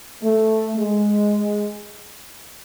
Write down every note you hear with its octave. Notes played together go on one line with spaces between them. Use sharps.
A3
G#3